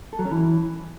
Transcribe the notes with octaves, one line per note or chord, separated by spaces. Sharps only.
A4
F#3
C#4
E3